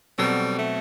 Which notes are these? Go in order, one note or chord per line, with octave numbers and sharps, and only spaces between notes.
B2 F#3 G3 C4 F#4 A4
A3